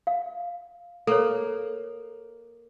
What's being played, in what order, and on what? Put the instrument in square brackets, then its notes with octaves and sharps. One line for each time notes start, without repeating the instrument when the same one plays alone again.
[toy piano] F5
[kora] A#3 [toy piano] A4 C#5